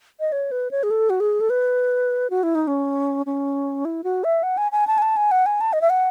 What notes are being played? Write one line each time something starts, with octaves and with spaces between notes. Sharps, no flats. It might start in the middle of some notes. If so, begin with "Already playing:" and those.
D#5
C#5
B4
C#5
G#4
A4
F#4
G#4
A4
B4
F#4
E4
D#4
C#4
C#4
E4
F#4
E5
F#5
G#5
G#5
A5
G#5
A5
G#5
F#5
G#5
A5
D#5
E5
F#5